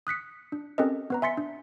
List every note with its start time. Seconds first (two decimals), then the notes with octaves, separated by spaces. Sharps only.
0.07 D#6 F#6 B6 C#7
0.52 D4
0.78 C4 C#4 G4 A4 A#4 D#5
1.10 B3 B4 A#5
1.22 E5 G#5 C6 A6 B6 C#7
1.37 D4